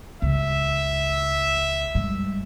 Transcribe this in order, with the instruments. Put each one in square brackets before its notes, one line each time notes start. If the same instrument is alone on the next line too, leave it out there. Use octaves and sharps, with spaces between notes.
[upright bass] C#2 [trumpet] E5
[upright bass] G2 G#3